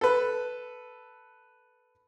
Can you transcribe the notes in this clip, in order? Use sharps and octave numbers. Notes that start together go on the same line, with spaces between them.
A4 B4